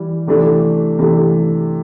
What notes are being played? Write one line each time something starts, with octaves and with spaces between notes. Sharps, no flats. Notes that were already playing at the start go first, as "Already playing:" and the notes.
Already playing: E3 G3
C3 E3 A3 D4
C3 E3 A3 D4